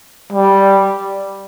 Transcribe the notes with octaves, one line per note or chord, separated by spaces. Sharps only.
G3